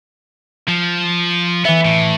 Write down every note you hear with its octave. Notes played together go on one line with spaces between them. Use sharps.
F3
E3 B3 E5
A2